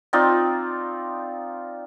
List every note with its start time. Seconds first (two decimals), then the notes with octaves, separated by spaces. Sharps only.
0.13 C4 D#4 F4 D5